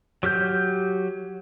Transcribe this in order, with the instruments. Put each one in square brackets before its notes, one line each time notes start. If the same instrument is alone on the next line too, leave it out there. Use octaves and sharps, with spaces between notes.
[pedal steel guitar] F#3 G4 F6 G6